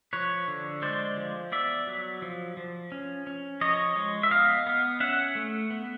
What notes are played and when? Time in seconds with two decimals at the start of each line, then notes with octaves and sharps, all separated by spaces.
0.13 F3 B4 C#5
0.48 D3
0.82 G#3 C5 D5
1.17 F3
1.52 B3 D5 E5
1.87 F#3
2.22 F3
2.57 F3
2.92 C#4
3.27 C#4
3.61 F3 C#5 D#5
3.96 G#3
4.23 E5
4.31 B3 D#5 F5
4.67 B3
5.00 C#4 E5 F#5
5.35 A3
5.70 B3